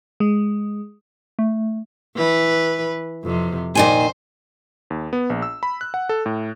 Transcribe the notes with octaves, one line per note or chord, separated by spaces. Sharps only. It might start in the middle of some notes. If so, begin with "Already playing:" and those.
G#3
A3
E3 B4
F2 C3
A#2 D#3 C5 G#5
D#2
B3
A#1
E6
B5
F#6
F#5
A4
A2